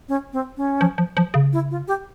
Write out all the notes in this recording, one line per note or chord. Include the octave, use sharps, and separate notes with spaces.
C#4
C4
C#4
F3
F3
F3
C#3
E4
F4
G4